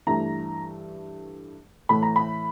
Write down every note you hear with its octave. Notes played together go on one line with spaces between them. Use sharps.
G2 E3 A3 A#5
A2 E3 A3 B5
A#5
B5